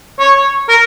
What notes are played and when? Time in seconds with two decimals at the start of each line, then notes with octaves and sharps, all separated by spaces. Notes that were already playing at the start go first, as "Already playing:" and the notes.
0.19 C#5
0.69 A#4